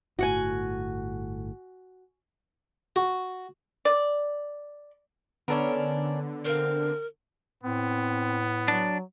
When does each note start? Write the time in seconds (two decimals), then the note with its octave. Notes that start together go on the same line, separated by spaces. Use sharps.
0.19 G1 A2 F#4 F#5 G#5
2.96 F#4
3.85 D5
5.48 D3 B3 C#4 D4 A4 A#4 C#5
6.45 C4 A#4 F5
7.63 A2 B3 C4
8.68 F#3 D4